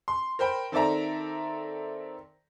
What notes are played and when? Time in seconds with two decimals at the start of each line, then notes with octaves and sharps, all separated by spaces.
0.08 C6
0.39 A#4 C5 G5 B5
0.72 D#3 C4 A4 D5 E5 A#5